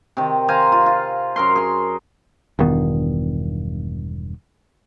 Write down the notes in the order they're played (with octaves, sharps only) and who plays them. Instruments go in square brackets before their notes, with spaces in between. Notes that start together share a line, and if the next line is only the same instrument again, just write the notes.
[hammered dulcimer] C3 D#3
C5 F5 G#5 A#5
F4
F4
F#2 A#4 C6
G#4 C6
[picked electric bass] E1 G2 D#3 B3